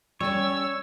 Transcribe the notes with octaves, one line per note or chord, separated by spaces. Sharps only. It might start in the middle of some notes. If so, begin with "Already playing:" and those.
G3 C#4 C#5 E6